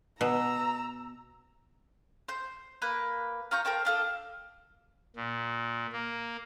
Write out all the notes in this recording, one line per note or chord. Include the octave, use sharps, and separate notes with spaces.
B2 A#5 E6
C5 G6
A#3 B4 F#6
F4 A#5 C#6 G6
A#4 C5 G5 A5
D4 F4 A4
A#2
A#3